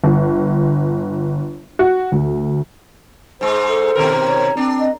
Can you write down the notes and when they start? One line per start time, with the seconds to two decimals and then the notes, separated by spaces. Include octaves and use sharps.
0.04 G1
1.79 F#4
2.12 D2
3.41 G#2 G#3 C5
3.68 A4
3.95 B2 D#3 A#4
4.27 C#5
4.57 C4 D4
4.80 D#5